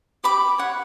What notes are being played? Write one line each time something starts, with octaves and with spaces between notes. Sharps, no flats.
G4 B5 D6
C#5 F#5